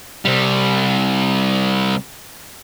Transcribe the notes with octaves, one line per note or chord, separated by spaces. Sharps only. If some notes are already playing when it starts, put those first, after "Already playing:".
C3 G3